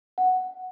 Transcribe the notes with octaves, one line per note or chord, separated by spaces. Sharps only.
F#5